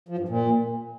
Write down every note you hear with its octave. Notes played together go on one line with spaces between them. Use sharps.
F3
G2
A#2